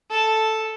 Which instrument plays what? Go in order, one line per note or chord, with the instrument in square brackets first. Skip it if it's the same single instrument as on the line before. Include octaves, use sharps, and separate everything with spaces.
[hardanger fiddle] A4